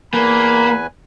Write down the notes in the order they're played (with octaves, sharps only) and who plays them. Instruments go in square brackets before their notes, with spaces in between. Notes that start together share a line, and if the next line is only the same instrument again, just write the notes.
[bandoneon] E2 B4 G#5 [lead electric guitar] A#3 [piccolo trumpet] B5